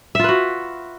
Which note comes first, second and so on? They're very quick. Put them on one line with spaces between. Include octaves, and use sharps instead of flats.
E5 F4 B4 F#4